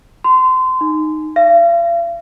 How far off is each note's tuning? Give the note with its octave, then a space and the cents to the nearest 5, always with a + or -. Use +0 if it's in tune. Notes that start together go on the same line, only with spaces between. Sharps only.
C6 -25
D#4 -10
F5 -40